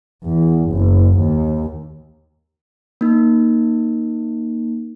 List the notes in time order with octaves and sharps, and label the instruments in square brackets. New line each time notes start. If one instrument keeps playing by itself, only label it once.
[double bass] E2
F#1
D#2
[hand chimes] A#3 D#4